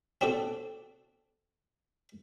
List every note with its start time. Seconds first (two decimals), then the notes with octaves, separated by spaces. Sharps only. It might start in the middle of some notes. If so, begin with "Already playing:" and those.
0.21 C4 D4 F#4 A4